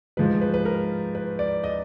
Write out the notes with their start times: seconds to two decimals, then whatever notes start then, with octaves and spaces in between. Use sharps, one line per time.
0.17 G#2 F3 G#3 B4
0.41 B4
0.54 B4
0.65 A#4
1.15 B4
1.39 D5
1.64 D#5